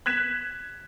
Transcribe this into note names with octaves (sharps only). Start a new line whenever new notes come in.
F#6 G#6 B6 E7